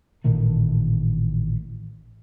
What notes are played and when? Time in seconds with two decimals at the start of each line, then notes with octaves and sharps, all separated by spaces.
0.24 A1 A#2 D#3 A3